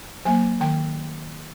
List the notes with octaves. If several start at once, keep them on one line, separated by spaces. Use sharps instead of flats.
F#3 A#3 G#5
D#3 G5